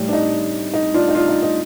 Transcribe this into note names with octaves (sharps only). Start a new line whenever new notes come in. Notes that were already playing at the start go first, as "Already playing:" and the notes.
Already playing: A2 G3
D4
D#4
D#4
D4 F4
D#4
D4 F4
D#4
D#4